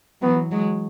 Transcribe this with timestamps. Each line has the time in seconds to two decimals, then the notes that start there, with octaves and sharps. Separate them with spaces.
0.22 E3 F#3 B3
0.51 F#3 G#3